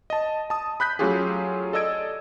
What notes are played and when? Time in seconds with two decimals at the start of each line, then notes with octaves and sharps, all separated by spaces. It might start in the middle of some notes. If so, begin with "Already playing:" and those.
0.10 D#5 A5
0.50 A5 D#6
0.80 B5 F#6 G6 B6
0.99 F#3 A3 C#4 F4 G4 G#4
1.73 A4 D5 D#5 E6 G#6 D7